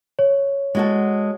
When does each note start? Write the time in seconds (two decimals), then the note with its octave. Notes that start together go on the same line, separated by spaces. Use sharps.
0.19 C#5
0.75 G#3 F#4 A4